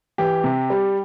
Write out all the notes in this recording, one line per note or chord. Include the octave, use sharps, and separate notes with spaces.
E3 G4
C3
G3